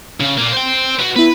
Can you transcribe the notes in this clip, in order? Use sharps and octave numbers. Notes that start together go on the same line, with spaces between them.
C#3
A#2 A#3
C5 G5
B3 F#4
B3 E4 B4